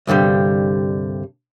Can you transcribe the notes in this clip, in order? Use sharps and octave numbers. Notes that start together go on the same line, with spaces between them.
C2 G2 D3 G3